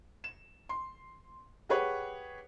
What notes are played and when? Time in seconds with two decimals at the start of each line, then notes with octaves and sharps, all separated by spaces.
0.24 E7
0.69 C6
1.69 G4 G#4 B4 C#5 F#5